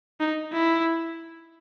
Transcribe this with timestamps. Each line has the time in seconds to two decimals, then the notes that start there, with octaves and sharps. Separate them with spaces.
0.20 D#4
0.53 E4